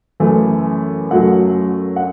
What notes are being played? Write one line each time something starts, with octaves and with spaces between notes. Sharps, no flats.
F#2 E3 A3
F#2 F#3 A3 F#5
F#5